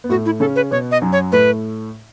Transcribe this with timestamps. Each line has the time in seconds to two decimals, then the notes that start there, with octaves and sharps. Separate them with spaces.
0.04 B3
0.09 A2 A3 F#4
0.26 E4
0.40 C#3 C#4 A4
0.56 B4
0.71 B2 B3 C#5
0.91 D#5
1.02 F#2 F#3
1.12 C#5
1.32 A2 A3 B4